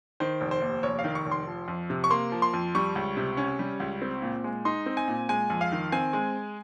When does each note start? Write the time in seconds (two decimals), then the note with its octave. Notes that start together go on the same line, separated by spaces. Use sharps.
0.20 D#3 C5
0.41 F1
0.51 C5
0.62 D#2
0.83 F1 C#5
0.99 F5
1.04 D#3
1.15 C#6
1.26 F1
1.31 C6
1.47 F3
1.68 F2
1.90 C3
2.04 C#6
2.10 A#3 C6
2.32 F3
2.42 C6
2.53 F2
2.75 G3 C#6
2.96 C#2
3.17 C3
3.37 C#4
3.59 G3
3.80 C#2
4.02 C4
4.22 A#2
4.44 G#3
4.65 D#4 C6
4.86 C4
4.97 G#5
5.08 A#2
5.29 G#3 G#5
5.50 F2
5.61 F5
5.72 D#3
5.92 C4 G#5
6.13 G#3